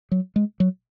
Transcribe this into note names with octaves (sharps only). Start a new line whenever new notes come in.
F#3
G#3
F#3